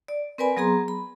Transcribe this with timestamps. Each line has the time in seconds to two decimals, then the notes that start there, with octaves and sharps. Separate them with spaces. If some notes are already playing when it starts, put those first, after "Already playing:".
0.08 D5
0.38 C4 A#4 B4 D5 G#5 B5
0.57 F#3 B3 G#4 A#5 C6
0.88 B5